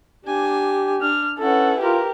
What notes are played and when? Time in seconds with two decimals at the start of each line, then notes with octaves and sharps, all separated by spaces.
0.25 D4 G4 G#5
1.01 D4 F6
1.39 C#4 E4 A4 B4 F#5
1.80 F4 G4 A#4